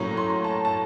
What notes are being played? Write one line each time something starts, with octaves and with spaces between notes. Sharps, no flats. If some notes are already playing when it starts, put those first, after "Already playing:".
Already playing: A2 F#3 A#3 C#4
C6
A5
A5